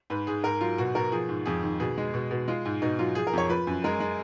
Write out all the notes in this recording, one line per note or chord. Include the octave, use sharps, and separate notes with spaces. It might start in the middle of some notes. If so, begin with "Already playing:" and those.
G#2 B4
G#2 G#4
G#2 A#4
F#3 F4
B2 F#4
B2 A#4
F3 G#4
G#2
F2 G#4
D#3
B2 G#4
G#3
B2
B2
G#3 F4
G#2
B2 D#4
F#3 F4
F3 G#4
A#4
F2 C#5
F3 B4
F#2
G#3 A#4
G#3